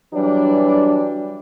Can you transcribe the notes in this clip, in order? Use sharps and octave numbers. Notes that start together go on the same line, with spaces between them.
E3 F#3 G3 D4